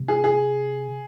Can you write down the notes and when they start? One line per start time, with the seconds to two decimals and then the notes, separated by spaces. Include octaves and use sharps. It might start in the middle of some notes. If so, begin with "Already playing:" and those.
Already playing: C3
0.08 G#4
0.24 G#4